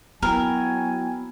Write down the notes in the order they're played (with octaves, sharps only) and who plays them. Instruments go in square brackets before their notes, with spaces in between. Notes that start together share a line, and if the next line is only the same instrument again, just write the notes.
[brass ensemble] F#3 F#4 G#5 [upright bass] B3 [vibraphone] E4 G5 B5 [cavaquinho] A#4